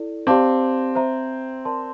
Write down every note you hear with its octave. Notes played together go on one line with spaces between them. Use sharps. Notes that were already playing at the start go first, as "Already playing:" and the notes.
Already playing: E4 A4 D5
C4 G4 D5 F5 A5 D6
C5 E5 A#5
A#4 D5 A5 C6